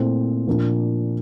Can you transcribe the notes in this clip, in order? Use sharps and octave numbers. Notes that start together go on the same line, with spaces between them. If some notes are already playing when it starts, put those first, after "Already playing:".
Already playing: A#2 A3 C4 E4
A#2 F3 A#3 D4